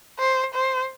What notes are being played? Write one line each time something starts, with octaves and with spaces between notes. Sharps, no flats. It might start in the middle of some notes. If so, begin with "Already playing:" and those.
C5
C5